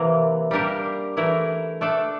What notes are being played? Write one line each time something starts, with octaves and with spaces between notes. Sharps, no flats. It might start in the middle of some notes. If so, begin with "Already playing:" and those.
Already playing: C3 E3 A#3
G3 A#3 D4 G4 A#4
E3 A3 E4 A#4
A3 D4 A4